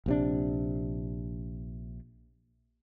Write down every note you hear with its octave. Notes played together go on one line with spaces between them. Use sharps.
A#1 C3 D4